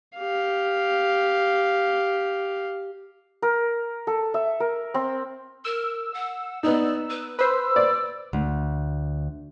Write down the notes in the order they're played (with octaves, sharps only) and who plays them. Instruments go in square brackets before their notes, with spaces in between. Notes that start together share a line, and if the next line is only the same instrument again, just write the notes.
[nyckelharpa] G4 F5
[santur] A#4
A4
E5
A#4
C4
[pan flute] A#4 [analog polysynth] E6
[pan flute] F#5
[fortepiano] B3 D#4 [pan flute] D5
[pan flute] B4
[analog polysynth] B4 C5 [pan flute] E6
[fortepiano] D5
[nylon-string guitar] D2